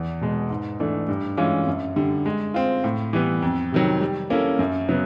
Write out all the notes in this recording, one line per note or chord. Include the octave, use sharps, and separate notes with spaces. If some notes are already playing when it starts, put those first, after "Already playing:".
Already playing: E2
B2 G#3
G#2
E3 A3 D4
G2
E3 G#3 C#4 F4
F#2
D3 G3
G#3
C4 F4
A2
E3 G3 B3
F2
C3 D#3 F#3
G3
A#3 C#4 E4 A4
F#2
C#3 F#3 B3